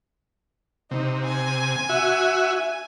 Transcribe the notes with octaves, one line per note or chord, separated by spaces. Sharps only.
C3 D#4
G#5
F#4 E5